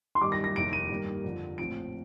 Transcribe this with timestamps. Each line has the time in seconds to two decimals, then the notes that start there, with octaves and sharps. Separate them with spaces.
0.15 C6
0.21 G2 D#3 G3 D6
0.32 A#6
0.44 A#6
0.55 F1 D#2 D#3 D7
0.73 D#7
0.90 G2 D#3 G3 A#3
1.24 F2 D3 F3
1.58 A#1 A2 F3 C4 D7